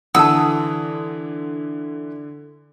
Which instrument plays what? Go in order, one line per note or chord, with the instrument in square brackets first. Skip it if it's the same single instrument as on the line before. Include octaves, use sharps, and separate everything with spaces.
[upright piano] D3 D#6 [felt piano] E3 [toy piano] F#5 A5 [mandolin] E6